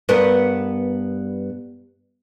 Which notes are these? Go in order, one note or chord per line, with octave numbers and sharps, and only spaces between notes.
G2 B3 A#4